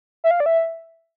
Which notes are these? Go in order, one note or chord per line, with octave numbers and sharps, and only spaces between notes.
E5
F5
D5
E5